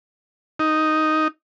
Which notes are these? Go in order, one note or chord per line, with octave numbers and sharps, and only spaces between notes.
D#4